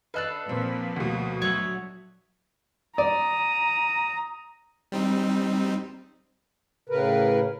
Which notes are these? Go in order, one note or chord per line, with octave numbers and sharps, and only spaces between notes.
D4 A4 B4 D#5 F5 F#6
A#2 F3 C4 B4
D2 B2
F#3 D4 C#5 E5 F#5
D5 A#5 D#6
G3 C4 D#4
A2 C#3 A#4 B4